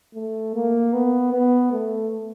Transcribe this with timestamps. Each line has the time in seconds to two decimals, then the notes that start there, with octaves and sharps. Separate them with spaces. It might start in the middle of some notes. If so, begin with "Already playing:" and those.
0.15 A3
0.55 A#3
0.93 B3
1.33 B3
1.72 A3